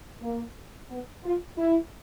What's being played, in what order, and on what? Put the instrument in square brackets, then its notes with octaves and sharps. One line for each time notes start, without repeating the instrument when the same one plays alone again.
[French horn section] A#3
B3
F4
E4